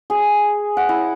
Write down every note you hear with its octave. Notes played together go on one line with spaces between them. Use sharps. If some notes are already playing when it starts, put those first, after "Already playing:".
G#4
F#5
E4